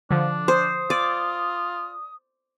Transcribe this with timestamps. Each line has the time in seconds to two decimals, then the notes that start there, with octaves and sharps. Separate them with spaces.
0.11 D3 F3 D4
0.48 C5 D#6
0.90 F4 D5